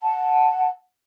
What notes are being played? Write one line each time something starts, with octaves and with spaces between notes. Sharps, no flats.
F#5 A5